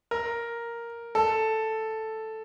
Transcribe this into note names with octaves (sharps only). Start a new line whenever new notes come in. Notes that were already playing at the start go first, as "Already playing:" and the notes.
A#4
A4